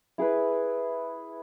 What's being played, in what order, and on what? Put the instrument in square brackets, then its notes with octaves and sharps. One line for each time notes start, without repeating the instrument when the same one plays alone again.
[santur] E4 G#4 B4